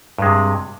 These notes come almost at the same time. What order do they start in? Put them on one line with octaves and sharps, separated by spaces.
G2 G#3 C3